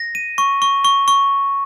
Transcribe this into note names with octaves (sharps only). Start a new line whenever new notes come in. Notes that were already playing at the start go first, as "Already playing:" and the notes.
Already playing: A#6
D#7
C#6
C#6
C#6
C#6